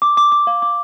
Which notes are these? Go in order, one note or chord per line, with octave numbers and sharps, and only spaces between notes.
D6
D6
D6
F5
D6